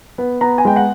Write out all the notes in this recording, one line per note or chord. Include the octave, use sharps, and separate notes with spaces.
B3
B3 A#5
G#5
G#3 G5
F#5